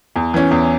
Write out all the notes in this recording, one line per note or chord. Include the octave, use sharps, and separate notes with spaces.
E2
E3 C#4
E2